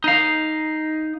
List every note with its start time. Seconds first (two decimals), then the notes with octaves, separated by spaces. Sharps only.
0.04 D#4 F5